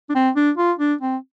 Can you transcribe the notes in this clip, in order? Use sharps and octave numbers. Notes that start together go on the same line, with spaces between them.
D4
C4
D4
F4
D4
C4